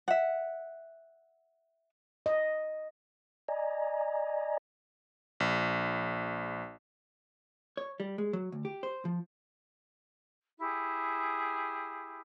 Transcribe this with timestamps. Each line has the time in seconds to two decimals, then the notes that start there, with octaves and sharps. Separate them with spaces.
0.08 E5 F#5
2.26 D#5
3.48 D5 D#5 G#5 A#5
5.40 A#1
7.77 C#5
8.00 G3
8.18 G#3
8.33 F#3
8.52 D2
8.65 G4
8.83 C5
9.05 F3
10.58 E4 G4 G#4